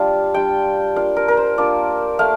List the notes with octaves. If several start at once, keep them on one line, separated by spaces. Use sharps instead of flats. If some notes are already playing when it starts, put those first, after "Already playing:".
Already playing: G3 D4 F4 F5
G3 D4 F4 G5
A#3 D4 F4 F5
A#4
A#4
C5
A#3 D4 F4 D5
A3 F5